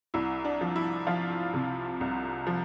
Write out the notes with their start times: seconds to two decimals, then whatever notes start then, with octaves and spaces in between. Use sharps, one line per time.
0.14 C2 E4
0.45 D4
0.61 F3
0.76 E4
1.07 F3 F4
1.54 C3
2.01 C2
2.47 F3